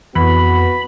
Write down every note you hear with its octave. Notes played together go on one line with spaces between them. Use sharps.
F2 E3 B3 F#4 B5